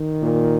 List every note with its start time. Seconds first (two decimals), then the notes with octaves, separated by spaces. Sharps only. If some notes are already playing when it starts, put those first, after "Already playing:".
Already playing: D#3
0.22 A#2